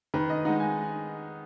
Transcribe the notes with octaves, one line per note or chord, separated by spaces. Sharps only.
D#3 B4
D#5
G#3 D#4 F#5
G#5